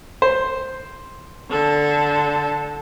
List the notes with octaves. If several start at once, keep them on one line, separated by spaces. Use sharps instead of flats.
C5
D3 A4